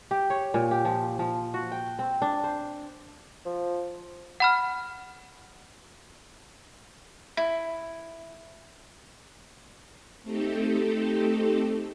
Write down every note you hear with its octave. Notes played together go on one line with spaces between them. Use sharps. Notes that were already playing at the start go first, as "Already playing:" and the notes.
G4
C#5
A#2
G4
F3
F3
F#4
G5
C4
D4
C5
F3
F#5 B5 F6
E4
A3 C4 D#4 G4 A4